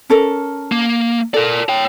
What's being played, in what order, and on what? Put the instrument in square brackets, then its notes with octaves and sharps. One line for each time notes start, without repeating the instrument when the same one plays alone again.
[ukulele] C#4 A4 A#4
[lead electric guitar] A#3
[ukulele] A4 [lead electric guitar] A#4 D5
[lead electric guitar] C#5 G5